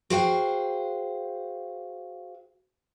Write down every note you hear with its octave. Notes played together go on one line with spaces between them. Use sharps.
F#4 G#4 C5 F5 G5